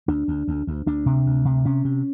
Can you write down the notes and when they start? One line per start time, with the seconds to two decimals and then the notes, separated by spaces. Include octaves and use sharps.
0.08 D2 D4
0.28 D2
0.48 D2
0.67 D2
0.86 D2 D4
1.06 C3
1.26 D2
1.45 C3
1.65 C3 C#4
1.85 C3